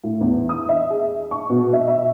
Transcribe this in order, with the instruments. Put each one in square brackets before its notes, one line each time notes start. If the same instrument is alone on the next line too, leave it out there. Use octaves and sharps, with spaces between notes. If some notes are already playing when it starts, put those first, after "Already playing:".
[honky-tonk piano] A2
E2
D#6
E5
G#4
C#6
B2
E5
E5